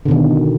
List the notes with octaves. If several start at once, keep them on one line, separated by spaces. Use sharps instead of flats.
B2 D3 D#3